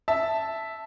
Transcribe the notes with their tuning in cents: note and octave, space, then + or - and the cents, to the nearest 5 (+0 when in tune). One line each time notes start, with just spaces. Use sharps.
E5 +0 A5 +0